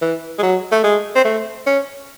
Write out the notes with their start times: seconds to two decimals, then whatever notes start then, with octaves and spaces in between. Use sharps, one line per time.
0.01 E3
0.38 G#3
0.43 F#3
0.72 A3
0.84 G#3
1.15 C4
1.25 A3
1.66 C#4